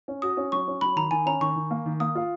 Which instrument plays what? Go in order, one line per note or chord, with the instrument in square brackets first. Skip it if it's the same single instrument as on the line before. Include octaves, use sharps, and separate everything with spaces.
[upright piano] C#4
[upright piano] F#4 [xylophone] D#6
[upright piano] C#4
[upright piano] F#3 [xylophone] C#6
[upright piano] C#4
[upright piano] F#3 [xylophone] B5
[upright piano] D#3 [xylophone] A#5
[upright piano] D#3 [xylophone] G#5
[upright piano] C#4 [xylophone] A#5
[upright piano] D#3 [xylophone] C#6
[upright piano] D#3
A#3
D#3
[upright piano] A#3 [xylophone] D#6
[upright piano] F4